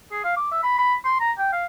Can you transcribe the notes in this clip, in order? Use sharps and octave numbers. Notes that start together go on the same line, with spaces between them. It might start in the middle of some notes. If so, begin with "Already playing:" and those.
G#4
F5
D6
E5
B5
B5
C6
A#5
G5
F5